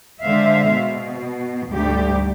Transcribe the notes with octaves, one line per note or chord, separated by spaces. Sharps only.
D3 G#3 C5 E5 F5
B2
D2 G#2 G3 A3 G4